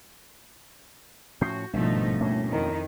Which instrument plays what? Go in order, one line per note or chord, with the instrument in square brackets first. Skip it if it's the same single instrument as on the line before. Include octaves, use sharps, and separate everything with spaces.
[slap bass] A2 F3 C#4 [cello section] F#4 [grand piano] G6 C7
[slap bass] G#1 [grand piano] G2 B2 [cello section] F3 A3 D#4
[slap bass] D2 A#3 C#4 [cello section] A2
[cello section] F2 D#3 [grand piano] E4 A#4